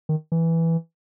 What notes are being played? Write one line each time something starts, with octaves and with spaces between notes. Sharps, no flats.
D#3
E3